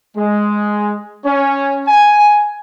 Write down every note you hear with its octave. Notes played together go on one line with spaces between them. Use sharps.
G#3
C#4
G#5